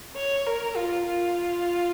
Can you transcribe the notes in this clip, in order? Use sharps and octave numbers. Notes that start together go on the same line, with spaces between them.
C#5
A#4
F4
F4